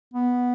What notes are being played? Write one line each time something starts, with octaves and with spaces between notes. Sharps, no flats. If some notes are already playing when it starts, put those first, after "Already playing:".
B3